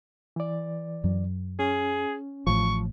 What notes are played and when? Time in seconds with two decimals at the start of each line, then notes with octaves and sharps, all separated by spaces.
0.36 E3 D5
1.04 F#2 F#3
1.59 C#4 G#4
2.47 A1 A2 F3 C#6